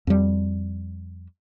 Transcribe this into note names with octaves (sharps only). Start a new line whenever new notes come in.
F2 G3